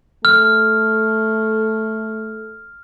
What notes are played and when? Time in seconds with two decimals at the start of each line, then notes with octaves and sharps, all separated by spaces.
0.25 A3 F6